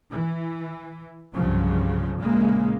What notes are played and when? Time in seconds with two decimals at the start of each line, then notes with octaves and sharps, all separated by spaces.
0.11 E3
1.34 C2 G2 C#3 F3 F#3
2.21 A#1 C#3 G#3 A#3